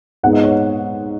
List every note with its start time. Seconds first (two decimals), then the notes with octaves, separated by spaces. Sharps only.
0.23 G#2 G#3 B3 D#4 F#5
0.33 D#5
0.43 C#5